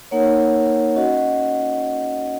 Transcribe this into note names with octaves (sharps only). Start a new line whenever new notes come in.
A#3 D#4 A#4 C#5 F#5
C#4 F#4 D#5 F#5